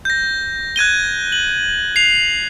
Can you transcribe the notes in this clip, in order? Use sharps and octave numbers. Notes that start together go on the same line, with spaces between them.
G6 A#6
F#6 G#6 D#7 G7
F#7
C7 F7